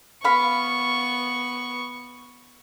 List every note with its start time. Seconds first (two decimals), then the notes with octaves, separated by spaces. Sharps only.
0.24 B3 F5 B5 C#6